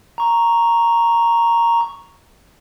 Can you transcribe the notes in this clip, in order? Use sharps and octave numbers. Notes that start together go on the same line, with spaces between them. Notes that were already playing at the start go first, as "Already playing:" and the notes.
A#5 C#6